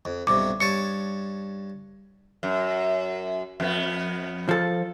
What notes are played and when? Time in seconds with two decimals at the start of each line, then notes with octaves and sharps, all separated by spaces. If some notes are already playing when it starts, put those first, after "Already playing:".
0.05 F2
0.27 B1 G2 C3 D6
0.60 G2 C#5 A5 C#7
2.43 F#2
3.60 F2 B3
4.49 F3 A4